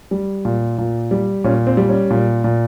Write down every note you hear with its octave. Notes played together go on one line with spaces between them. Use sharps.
G3
A#2
A#2
G3
A#2 C#4
C4
G3
C#4
A#2
A#2